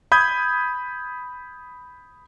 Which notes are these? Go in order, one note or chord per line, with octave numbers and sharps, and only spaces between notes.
B5 D#6 G6 G#6